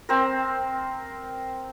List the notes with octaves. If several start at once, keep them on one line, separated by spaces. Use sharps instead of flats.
C4 A#4